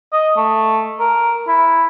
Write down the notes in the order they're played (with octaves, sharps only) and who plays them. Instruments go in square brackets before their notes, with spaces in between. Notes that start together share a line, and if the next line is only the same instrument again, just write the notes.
[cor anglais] D#5
A3
A#4
E4